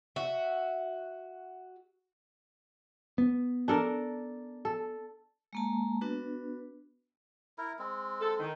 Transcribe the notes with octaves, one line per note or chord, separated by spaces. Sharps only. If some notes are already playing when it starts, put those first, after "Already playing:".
F#4 E5
B3
D4 A4 A#4
A4
G#3 A#3 A5
B3 D4 F#4 B4
E4 A#4
G#3 C4
A4
D#3